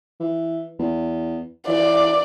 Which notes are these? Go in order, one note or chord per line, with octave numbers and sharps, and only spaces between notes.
E3
E2
E3 D5